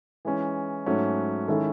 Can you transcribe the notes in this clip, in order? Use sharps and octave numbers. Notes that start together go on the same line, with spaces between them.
E3 G#3 C#4
G#2 F#3 A3 C#4
D#3 G#3 C#4 E4 A4